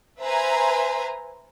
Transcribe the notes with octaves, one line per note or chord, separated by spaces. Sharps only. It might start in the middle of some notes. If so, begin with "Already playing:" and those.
B4 C5 E5 G#5 A#5